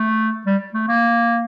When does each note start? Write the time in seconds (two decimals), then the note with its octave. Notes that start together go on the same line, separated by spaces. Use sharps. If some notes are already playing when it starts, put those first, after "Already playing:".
Already playing: A3
0.47 G3
0.74 A3
0.88 A#3